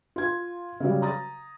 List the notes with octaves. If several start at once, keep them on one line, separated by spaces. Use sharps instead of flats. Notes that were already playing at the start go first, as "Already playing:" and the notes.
F4 G#6
C#3 F#3 G3
A#5 D#6 A6